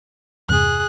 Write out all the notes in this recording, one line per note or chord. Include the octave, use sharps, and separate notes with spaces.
E2 G2 C3 G#4 F#6